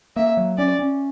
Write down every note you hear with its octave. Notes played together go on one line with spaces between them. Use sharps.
A#3 E5
F#3
C#4 D5
C#4